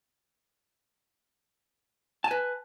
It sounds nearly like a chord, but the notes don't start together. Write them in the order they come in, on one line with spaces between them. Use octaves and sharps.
A5 G#5 B4